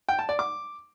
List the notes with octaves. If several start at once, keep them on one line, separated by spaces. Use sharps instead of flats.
G5
A5
D5
D6